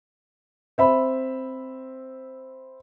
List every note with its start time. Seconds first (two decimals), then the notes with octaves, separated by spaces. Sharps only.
0.78 C4 E5 B5